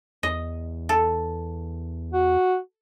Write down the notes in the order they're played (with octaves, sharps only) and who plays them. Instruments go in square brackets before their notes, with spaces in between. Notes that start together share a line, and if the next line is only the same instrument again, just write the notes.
[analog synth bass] E2 [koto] D#5
[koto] A4
[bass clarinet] F#4